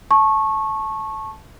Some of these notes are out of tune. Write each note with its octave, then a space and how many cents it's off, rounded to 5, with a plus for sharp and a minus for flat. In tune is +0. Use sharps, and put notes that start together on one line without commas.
A5 -10 C#6 -20